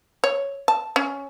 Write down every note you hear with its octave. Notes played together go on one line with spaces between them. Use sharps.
C#5
A5
C#4